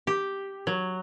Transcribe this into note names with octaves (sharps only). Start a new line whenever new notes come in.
G4
F#3